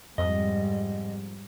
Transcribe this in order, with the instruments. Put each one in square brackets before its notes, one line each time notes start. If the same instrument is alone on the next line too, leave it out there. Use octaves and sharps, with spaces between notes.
[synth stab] F2 [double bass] G#2 G3 [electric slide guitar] D#5